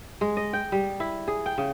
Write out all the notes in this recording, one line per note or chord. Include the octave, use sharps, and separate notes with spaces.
G#3
D#5
G5
G3
E4
G#4
G5
C#3